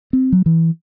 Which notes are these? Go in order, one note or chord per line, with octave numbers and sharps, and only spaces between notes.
C4
F#3
E3